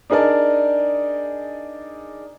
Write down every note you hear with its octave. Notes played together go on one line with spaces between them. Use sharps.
D4 D#4 G#4 A#4 D5 A5